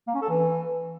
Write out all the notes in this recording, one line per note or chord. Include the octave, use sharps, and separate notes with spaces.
A#3
C#4
A4
E3